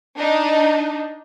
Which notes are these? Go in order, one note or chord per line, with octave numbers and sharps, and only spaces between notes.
D4 D#4